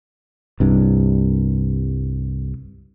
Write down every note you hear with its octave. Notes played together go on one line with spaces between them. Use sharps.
C2 G2